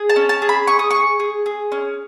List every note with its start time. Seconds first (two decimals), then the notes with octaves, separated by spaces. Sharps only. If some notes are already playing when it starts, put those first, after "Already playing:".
Already playing: G#4
0.09 A5
0.16 C#4
0.29 A5
0.42 G#4
0.49 B5
0.67 G#4 C#6
0.79 D#6
0.90 G#4 C#6
1.20 G#4
1.46 G#4
1.72 C#4